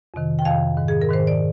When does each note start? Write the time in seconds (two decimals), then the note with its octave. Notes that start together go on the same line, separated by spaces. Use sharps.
0.14 F2 C3 D#3
0.39 G5
0.45 F2 C3 D#3 F5
0.77 G#2 D#3
0.88 G#4
1.02 A#4
1.09 G#2 D#3 C5
1.27 D5